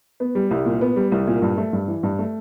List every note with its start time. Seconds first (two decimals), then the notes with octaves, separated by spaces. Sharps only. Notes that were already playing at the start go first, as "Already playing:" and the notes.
0.20 B3
0.35 G3
0.51 C2
0.65 A#2
0.81 B3
0.96 G3
1.12 C2
1.27 A#2
1.42 G2
1.57 A3
1.73 G2
1.88 E3
2.03 G2
2.19 A3